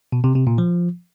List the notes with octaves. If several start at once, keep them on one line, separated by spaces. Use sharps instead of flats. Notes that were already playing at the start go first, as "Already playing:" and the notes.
B2
C3
C3
A#2
F3